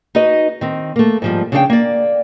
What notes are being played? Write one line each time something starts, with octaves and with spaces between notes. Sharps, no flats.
D#4 F#4 B4 D#5
D#3 C4
A3 A#3
G#2 F3 G3
C#3 D4 G4 A4 F5 G5
A#3 D5